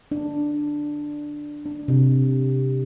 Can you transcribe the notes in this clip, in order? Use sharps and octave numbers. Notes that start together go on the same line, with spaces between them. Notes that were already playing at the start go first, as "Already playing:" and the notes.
D4
D4
C3